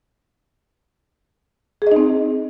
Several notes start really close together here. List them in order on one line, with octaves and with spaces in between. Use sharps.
G#4 D#5 D#4 C4